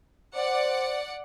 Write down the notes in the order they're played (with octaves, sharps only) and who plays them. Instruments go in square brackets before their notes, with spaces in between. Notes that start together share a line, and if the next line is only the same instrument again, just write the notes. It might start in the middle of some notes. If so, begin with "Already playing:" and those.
[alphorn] C5 [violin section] D5 F#5